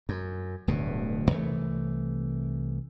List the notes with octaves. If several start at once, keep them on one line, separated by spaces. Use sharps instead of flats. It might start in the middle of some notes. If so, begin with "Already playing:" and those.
F#2
D1 D2 G2 B2
C2 E3 G#3 A3